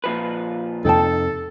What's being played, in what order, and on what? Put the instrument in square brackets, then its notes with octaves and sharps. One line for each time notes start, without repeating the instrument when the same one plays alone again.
[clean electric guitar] A#2 F3 B4
[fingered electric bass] F2 C3 [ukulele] D#4 G5 A5 [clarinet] A4